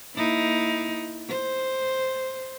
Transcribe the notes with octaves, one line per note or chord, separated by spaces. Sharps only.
A#3 D#4 E4
C5